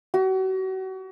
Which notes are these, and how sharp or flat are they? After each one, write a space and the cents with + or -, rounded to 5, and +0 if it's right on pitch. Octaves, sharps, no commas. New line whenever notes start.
F#4 +35